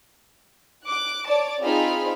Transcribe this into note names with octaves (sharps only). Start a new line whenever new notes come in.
D6 F#6
C#5 D5 A5 D6
C4 D#4 F4 G#4 B5 F6